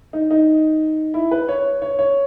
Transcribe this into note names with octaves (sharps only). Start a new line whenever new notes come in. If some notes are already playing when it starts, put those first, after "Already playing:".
D#4
D#4
E4
B4
C#5
C#5
C#5